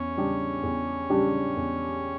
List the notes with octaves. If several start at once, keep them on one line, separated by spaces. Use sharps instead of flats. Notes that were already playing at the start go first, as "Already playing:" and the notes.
Already playing: E2 C#4
C#3 G3 D4 G4
E2
C#3 G3 D4 G4
E2